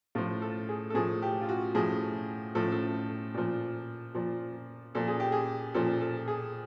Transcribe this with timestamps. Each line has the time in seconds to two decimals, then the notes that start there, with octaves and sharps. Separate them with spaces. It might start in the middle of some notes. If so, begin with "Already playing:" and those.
0.15 A2 F3 F4
0.42 A4
0.69 G#4
0.90 A4
0.94 A2 F3 G#4
1.22 G4
1.41 F4
1.49 F#4
1.75 A2 F3 G#4
2.55 A2 F3 A4
2.72 A4
3.34 A#2 F3
4.15 A#2 F3
4.95 A#2 F3 A4
5.08 G#4
5.20 G4
5.32 G#4
5.74 A#2 F3 A4
6.01 A4
6.28 G#4